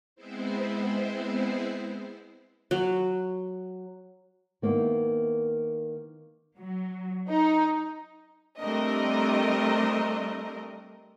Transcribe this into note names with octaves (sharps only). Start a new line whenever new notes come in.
G#3 B3 C4 E4 C5
F#3
D#3 A#3 B3 D#4 E4
F#3
D#4
G3 A3 C4 D4 A#4 D#5